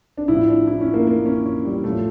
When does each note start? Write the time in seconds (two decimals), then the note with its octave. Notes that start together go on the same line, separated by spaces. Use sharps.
0.17 D4
0.28 A2 F3 E4
0.49 D4
0.67 E4
0.81 C#4
0.94 A#3
1.07 A#3
1.26 C#4
1.46 C#4
1.65 G3
1.84 A2 F3 A3